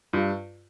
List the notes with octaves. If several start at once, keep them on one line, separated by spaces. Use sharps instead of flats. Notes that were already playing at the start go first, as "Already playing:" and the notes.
G2 F4